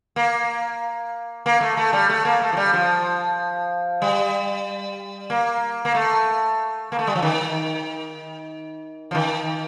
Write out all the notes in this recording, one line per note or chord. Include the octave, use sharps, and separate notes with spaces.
A#3
A#3
A3
A3
G3
A3
A#3
A3
F3
G3
F3
G3
A#3
A#3
A3
A#3
A3
G3
F3
D#3
F3
D#3